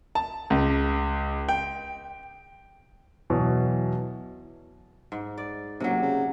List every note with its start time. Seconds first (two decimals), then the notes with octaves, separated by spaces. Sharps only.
0.15 A5
0.50 C#2
1.49 G5
3.30 E2 B2 E3 F#3
5.12 G#2
5.38 D5
5.80 F#1 C3 F#3
6.02 C#3